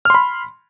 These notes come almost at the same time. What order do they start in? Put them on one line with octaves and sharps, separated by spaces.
F6 C6 B5